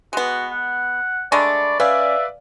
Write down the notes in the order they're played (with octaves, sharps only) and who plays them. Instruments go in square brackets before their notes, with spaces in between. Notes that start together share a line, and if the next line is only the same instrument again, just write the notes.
[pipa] G#3 B3 [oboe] F#4
[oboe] F#5
[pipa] G#3 A3 D4 [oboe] D5 [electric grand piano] B5 C#6
[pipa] C#4 [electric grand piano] B4 D5 F5 [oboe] E5